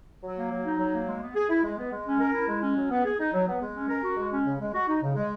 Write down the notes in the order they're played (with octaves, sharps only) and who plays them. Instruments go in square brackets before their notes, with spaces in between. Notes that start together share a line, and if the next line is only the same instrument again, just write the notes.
[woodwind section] F#3
A#3
F#3
D#4
F#3
A#3
G#3
B3
G#4
E4
G#3
B3
G#3
C#4
A#4
E4
G#3
C#4
F#3
B3
G#4
D#4
F#3
B3
G#3
C#4
A#4
F#4
G#3
C#4
C#3
G#3
F#4
D#4
C#3
G#3